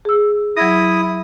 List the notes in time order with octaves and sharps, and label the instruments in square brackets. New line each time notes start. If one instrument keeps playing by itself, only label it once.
[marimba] G#4 E6
[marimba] F#3 G#6 A#6 [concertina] E4 D#6